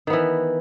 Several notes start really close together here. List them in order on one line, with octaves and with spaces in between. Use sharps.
D#3 B3 E3